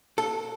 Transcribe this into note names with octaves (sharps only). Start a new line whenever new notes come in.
A4